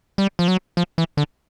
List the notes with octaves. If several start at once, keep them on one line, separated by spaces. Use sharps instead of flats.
G3
F3
F#3
F3
E3
D3